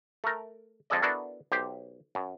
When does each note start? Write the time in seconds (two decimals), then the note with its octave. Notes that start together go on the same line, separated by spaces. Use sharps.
0.24 A3 A#4
0.90 F2 F3 G#3 A4 D5 D#5
1.02 B3 D4 E4 F#4 A4 A#4
1.52 B1 G4 C5
2.15 F#2